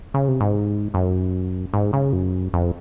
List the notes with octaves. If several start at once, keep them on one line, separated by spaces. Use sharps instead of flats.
C#3
C3
G#2
F#2
G#2
C#3
F#2
F2